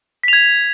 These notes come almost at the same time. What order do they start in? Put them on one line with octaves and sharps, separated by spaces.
B6 F7 G#6